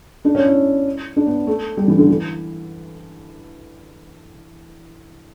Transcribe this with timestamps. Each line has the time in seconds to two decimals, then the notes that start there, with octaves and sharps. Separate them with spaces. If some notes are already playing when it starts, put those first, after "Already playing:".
0.25 D4
0.35 C#4
0.45 E4
1.16 D4
1.26 B3
1.47 A3
1.77 G3
1.88 E3
1.98 D3
2.09 E3